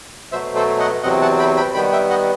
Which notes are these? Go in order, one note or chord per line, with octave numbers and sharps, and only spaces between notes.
B2 F#3 A3 C5 E5
A4 C5
D#5 F#5
E2 C3 F#3 C4 D#5 F#5
F#5 A5
G5 B5
G5 B5
D#3 G3 B3 G5 B5
E5 G5
D#5 F#5